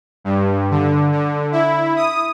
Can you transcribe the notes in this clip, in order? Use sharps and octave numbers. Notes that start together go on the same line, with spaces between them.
G2
D3
D3
E4
D#6